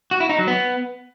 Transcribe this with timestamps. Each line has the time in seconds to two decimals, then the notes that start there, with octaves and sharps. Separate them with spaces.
0.11 F#4
0.20 E4
0.29 D#4
0.38 F#3
0.48 B3